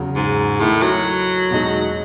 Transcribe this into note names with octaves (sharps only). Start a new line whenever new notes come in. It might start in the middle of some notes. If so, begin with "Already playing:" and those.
Already playing: E2 C#3 F#3
G#2
A2 D#3 A3 E4
F#3
E2 B2 G#3 D#4 F#4